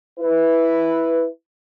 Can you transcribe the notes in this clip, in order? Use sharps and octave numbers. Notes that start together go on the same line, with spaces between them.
E4 B4